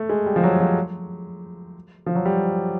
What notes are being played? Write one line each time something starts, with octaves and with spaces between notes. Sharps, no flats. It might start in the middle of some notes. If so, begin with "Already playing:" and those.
Already playing: A3
G#3
G3
F3
F#3
F3
F3
F#3
G3